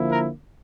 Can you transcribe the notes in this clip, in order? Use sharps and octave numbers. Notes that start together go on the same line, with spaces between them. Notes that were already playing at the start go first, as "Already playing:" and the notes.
Already playing: D3 F3 A#3 E4
A#4